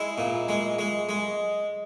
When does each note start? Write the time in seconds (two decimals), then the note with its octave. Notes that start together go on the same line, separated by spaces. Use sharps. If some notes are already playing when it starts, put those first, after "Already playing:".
Already playing: G#3 E4
0.18 A#2
0.49 G#3
0.79 G#3
1.09 G#3